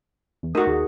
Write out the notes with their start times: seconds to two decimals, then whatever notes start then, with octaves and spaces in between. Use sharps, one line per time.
0.43 E2
0.55 A3 D#4 F#4 A#4 D#6
0.67 D#2 G#4